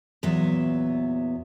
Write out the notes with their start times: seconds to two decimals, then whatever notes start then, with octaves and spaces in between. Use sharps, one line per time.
0.23 E2 A#2 F#3 B3 E5